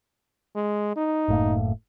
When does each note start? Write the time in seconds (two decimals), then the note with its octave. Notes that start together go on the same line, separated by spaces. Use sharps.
0.55 G#3
0.96 D#4
1.28 F#1 A2 A#3